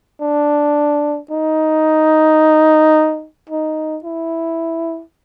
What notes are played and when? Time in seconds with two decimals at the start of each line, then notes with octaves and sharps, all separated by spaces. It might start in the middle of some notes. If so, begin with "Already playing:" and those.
0.21 D4
1.31 D#4
3.50 D#4
4.04 E4